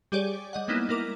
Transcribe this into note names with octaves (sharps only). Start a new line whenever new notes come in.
G3 G4 G#4 C#5 D5
G3 D#5 F#5
G3 G#3 A#3 B3 D#4 E4
A#3 E4 A#4 D6